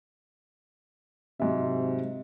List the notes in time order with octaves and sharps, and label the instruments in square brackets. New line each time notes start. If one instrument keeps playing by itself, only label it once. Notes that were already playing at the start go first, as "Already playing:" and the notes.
[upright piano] G#2 F#3 E5 [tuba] C3